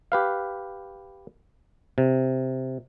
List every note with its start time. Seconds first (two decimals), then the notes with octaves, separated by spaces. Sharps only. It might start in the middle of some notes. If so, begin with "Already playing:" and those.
0.12 G4 B4 F5
1.98 C3